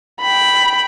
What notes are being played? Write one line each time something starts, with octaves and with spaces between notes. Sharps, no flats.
G5 B5